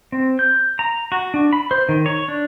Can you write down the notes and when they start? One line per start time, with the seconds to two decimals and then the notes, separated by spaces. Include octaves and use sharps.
0.12 C4
0.39 G6
0.79 A#5
1.12 F#4
1.34 D4
1.53 B5
1.71 C5
1.89 D#3
2.06 C#5
2.28 D4